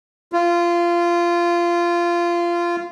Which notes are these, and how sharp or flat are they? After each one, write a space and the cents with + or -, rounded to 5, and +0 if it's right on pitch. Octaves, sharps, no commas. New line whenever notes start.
F4 -20